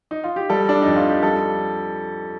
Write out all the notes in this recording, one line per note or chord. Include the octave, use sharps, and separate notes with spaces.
D#4
F4
G4
G3 A4
D4
F2 D#4
F4
G4
G3 A4